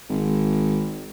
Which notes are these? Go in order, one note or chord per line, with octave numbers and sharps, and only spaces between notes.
G#1